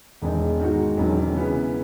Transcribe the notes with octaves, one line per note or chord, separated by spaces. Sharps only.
E1 E2 D#3 G#3 D#4
G#2 D#3 G#3 D#4 F#4
E1 E2 D#3 F#3 C#4
C#3 E3 B3